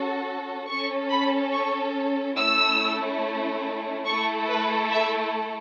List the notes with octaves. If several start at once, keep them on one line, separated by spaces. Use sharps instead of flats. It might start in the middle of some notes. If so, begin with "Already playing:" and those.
Already playing: C#4 F#4 A4
C#4 A4 C#6
B5
C#6
A3 C#4 E4 E6
A3 E4 A4 C#6
B4
E5